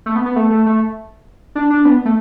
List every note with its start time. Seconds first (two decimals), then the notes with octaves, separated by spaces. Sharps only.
0.06 A3
0.16 B3
0.26 B3
0.36 A3
0.50 A3
0.66 A3
1.55 D4
1.70 D4
1.85 B3
2.05 A3